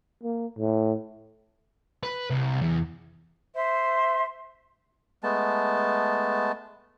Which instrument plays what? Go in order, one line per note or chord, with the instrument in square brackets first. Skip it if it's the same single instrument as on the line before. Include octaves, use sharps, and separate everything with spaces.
[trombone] A#3
A2
[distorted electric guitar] B4
C2
E2
[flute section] C5 E5 C6
[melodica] G#3 A3 B3 A5